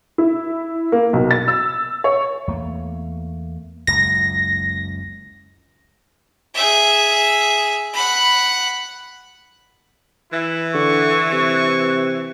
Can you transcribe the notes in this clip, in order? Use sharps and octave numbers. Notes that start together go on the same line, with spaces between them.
E4
A#3
B1
A6
E6
C#5
E2 A3 A#3
F#1 C#2 A#6
G#4 E5
F#5 B5
E3 E4
D3 C#6
C3 C#6